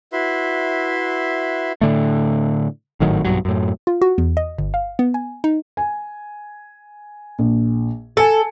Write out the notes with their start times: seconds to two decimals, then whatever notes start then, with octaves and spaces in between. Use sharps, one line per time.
0.13 E4 F#4 B4 E5 C6
1.81 A2 D3 A3
3.00 G#1 A2 D#3 F#3
3.25 B1 E2 G2 F#3
3.45 F#2 A2
3.87 F4
4.01 F#4
4.18 E2
4.37 D#5
4.58 G1
4.74 F5
4.99 B3
5.14 G#5
5.44 D#4
5.77 G#5
7.39 A#1
8.17 A4 G#5 A5 C#7